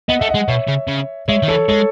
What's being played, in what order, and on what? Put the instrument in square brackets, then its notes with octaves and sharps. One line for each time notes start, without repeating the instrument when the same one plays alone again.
[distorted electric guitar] B3 [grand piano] D#5 F#5
[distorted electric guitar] A3 [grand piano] E5
[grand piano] D#5 F#5
[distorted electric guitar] G#3
[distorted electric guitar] B2 [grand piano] C#5 E5
[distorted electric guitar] C#3
C#3
[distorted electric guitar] G#3 [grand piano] C#5 E5
[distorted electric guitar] D#3
[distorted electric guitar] E3 [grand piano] A4 C#5
[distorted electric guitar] G#3 [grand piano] A4 C#5